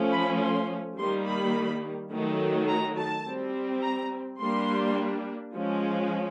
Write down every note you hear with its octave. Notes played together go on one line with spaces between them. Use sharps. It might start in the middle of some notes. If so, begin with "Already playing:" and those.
Already playing: F3 A3 C#4
B5
C6
D#3 G3 A#3 C6
B5
D#3 F#3 A3
A#5
A5
G3 C4
A#5
G3 A#3 D4 C6
F3 G#3 C#4